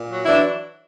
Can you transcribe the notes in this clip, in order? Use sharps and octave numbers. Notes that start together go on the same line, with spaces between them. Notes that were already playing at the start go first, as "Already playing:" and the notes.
Already playing: A#2
F#3
E3 D4 E4